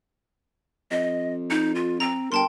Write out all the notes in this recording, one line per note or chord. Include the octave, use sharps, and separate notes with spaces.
F2 D#5
D#4
F4
C4 A#5
G1 A#4 G5 A5 C6